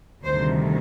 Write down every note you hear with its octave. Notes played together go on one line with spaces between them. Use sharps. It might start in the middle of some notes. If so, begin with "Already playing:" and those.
D2 C3 D#3 G3 C5